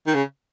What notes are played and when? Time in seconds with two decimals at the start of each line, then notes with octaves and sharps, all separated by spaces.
0.07 D#3
0.14 C#3